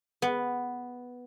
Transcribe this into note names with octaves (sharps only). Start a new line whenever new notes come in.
B3